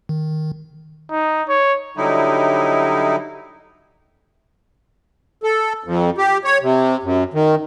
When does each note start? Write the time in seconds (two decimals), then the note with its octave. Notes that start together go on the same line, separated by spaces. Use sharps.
0.09 D#3
1.11 D#4
1.49 C#5
1.97 D3 F#3 G3 D#4 E4
5.43 A4
5.84 F2
6.18 G4
6.44 C#5
6.62 C3
7.03 F#2
7.34 D#3